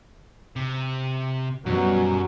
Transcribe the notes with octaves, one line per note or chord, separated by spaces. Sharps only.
C3
F#2 B2 F#3 G3